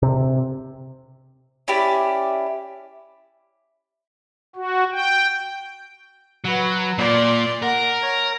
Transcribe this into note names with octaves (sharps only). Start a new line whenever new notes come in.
C3
C#4 E4 G4 D5
F#4
G5
F#3 F#4 B4
A#2 D5 C6
A#4 F#5 A#5
C#5